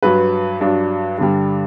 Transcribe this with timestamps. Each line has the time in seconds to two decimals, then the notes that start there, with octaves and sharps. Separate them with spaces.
0.03 G2 F#3 B4
0.61 G2 F#3 D4
1.18 G2 D3 G3